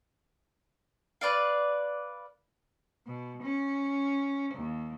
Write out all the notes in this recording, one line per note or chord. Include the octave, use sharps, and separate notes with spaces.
B4 D5 F5
B2
C#4
D#2